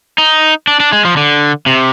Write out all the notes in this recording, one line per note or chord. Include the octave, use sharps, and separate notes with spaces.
D#4
D4
D4
G#3
F3
D3
C3